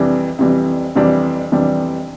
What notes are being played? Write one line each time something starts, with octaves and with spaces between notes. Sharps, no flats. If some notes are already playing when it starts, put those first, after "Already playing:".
Already playing: F2 C3 E3 G3 D4
F2 C3 E3 G3 D4
F2 C3 E3 G3 D4
F2 C3 E3 G3 D4